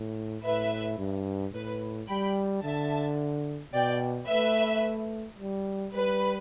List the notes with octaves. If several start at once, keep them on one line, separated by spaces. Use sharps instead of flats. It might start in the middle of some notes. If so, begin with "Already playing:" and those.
Already playing: A2
A2 B4 E5
G2
A2 B4
G3 G5 B5
D3 E5 A5
B2 D5 G5
A3 B4 E5
G3
G3 B4